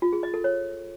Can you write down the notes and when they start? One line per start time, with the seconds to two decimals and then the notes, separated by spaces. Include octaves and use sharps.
0.02 F4
0.13 G#4
0.23 D#5
0.34 A4
0.44 C#5